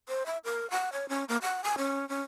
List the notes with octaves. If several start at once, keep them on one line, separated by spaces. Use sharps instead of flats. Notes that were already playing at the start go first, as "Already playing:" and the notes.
C5
E5
A#4
F#5
C#5
C#4
A#3
F#5
G#5
C#4
C#4